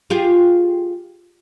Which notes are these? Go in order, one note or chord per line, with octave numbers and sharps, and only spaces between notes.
F4 G4 G#4